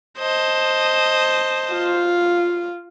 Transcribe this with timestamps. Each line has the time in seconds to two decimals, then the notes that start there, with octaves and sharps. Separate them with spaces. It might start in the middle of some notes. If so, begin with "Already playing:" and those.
0.19 C5 D#5 A5
1.71 F4